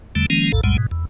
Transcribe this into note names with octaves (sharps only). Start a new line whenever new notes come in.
E2 D3 G3 A3
D#3 F3 G#3 A#3 C#4
A#1 E2 A2 A4
B1 F2 A2 G3 G#3
G#2 B2
E2